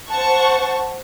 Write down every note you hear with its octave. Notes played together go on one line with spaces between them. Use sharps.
C5 F#5 A5 C#6